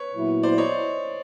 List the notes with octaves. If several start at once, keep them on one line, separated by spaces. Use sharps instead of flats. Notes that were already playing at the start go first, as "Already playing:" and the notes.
Already playing: B4 C#5
A#2 F#3 B3 E4
C5 D5
C#5 D#5